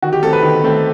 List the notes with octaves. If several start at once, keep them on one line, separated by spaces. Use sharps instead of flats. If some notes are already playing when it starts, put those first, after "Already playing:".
D#3 F#4
G4
A3 C4 A4
B4
D#3
A3 C4